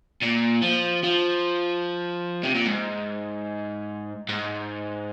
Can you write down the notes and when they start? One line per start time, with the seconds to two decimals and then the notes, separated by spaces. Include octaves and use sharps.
0.23 A#2
0.63 F3
1.04 F3
2.44 C3
2.55 A#2
2.66 G#2
4.29 G#2